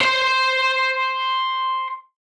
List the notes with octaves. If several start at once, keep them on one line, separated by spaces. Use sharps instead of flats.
C5 C6